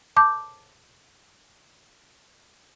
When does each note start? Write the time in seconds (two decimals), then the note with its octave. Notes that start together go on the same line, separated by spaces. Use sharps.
0.16 A5 D6 G6